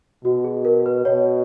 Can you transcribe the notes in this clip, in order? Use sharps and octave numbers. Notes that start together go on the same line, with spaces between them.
B2 F#4
G#4
A#4
B4
B2 C#5